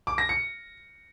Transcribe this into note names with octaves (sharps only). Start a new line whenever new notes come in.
D6
A#6
C#7